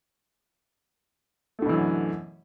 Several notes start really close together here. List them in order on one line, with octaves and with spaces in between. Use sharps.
A3 D3 B2 E3 F#2